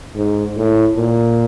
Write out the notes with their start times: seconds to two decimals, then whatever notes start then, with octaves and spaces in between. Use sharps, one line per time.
0.16 G#2
0.57 A2
0.96 A#2